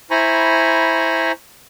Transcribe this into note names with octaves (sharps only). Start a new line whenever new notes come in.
E4 C5 G#5 A#5 B5 C#6